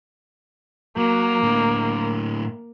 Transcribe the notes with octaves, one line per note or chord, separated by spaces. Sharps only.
F#3 A#3
A2 D3